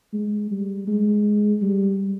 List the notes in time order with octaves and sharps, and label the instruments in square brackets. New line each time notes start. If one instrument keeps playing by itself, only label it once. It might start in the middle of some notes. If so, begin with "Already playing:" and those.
[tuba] G#3
G3
G#3
G3